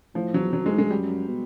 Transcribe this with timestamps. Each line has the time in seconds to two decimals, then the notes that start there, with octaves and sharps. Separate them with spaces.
0.15 A2 F3
0.34 E2 F#3
0.53 F2 F#3
0.62 F#2 G#3
0.72 G#2
0.78 G2 G#3
0.90 F#2 G3
1.28 B2